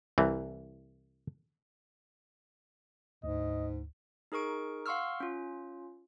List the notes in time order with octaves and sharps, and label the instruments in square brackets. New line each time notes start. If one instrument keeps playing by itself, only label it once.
[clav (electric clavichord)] C2 E3
[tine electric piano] D2 [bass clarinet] G#2 [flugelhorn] D#5
[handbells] D#4 G#4 A#4 C#6 D7
F5 F#5 C6 C#6 E6 F6
C#4 F4